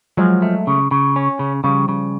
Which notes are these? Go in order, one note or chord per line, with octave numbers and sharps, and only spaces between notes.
F3 F#3 G#3
A3
C#3
C#3
C#4
C#3
C#3 F3 G3
C#3